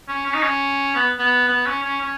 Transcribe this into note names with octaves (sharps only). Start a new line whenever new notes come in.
C#4
C#4
D#4
C#4
B3
B3
B3
C#4
C#4
C#4